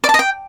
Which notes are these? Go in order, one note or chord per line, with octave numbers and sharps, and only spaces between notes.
D5
A5
D#5
G5